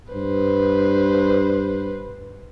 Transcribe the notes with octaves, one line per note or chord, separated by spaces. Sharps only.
G2 B4 C5